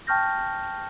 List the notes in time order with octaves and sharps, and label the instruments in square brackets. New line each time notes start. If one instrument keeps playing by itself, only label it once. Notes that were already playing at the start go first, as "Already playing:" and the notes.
[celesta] G5 A5 C#6 F6 G6 A#6